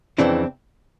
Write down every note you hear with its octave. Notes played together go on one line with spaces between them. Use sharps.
F2 C#3 E3 C4 D4